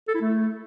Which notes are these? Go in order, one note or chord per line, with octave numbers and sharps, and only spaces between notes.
A4
E4
A3